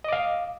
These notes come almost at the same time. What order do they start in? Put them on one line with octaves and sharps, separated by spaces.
D#5 D6 F5